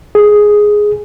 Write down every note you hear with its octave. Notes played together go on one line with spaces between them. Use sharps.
G#4